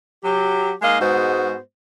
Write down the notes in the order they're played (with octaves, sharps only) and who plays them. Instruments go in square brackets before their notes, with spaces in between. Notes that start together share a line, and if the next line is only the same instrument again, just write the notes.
[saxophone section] F#3 G4
G#3 A#3 D#4 D#5 F5
G#2 G#3 B3 F#4 C5